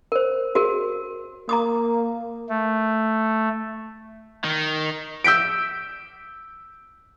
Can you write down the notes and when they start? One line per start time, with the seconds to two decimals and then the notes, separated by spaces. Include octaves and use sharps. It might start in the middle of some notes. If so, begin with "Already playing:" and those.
0.12 A#4 C5
0.55 F#4 G#4 A#4
1.49 A#3 A#5 D6 D#6
2.49 A3
4.44 D#3
5.24 E6 G6 B6 D7